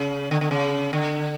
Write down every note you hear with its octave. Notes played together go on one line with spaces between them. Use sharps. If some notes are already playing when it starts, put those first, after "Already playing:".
Already playing: C#3
D3
D3
C#3
D3